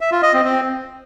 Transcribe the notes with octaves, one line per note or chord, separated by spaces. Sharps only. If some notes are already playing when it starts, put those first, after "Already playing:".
E5
F4
D#5
C4
C4